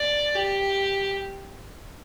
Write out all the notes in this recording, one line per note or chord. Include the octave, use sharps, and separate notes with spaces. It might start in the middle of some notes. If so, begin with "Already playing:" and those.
Already playing: D5
G4